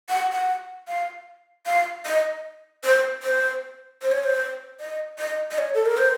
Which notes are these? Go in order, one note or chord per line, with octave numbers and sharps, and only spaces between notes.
F#5
F#5
F5
F5
D#5
C5
C5
C5
C#5
C5
D#5
D#5
D#5
C#5
A4
A#4
C5